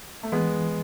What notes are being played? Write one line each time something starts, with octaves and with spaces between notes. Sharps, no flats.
A3
E3 G#3 B3